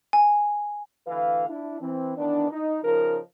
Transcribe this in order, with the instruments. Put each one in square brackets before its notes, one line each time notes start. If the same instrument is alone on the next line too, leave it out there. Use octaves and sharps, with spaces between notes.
[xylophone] G#5
[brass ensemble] D2 D3 E3 B4 F5
D4 E4
E3 C4
D#3 E3 B3 D4
D#4
C#3 F3 D#4 A#4